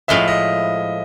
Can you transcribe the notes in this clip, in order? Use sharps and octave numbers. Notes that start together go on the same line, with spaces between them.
A2 F3 G#3 E5
D#5